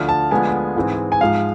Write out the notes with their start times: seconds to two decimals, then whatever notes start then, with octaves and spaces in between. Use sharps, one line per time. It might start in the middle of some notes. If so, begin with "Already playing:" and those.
Already playing: D2 D3 F3 F6
0.09 A5
0.31 D2 D3 F3 G#3 B3 G#5
0.76 G#2 E3 G#3 C4
1.12 G#5
1.21 G#2 F3 G#3 F5